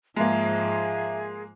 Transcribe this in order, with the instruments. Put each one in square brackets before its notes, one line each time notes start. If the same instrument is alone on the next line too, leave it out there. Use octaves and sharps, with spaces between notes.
[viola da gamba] G#2 F3 [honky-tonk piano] G#3 A#3 [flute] G#4 [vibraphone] E5 A#5